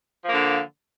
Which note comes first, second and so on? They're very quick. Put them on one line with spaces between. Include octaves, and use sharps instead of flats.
F3 A#3 D3